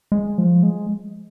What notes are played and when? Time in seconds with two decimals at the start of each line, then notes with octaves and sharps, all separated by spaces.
0.12 G#3
0.38 F3
0.63 G#3